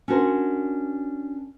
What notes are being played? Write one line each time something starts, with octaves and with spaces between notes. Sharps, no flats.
C#4 D4 F#4 A#4 C5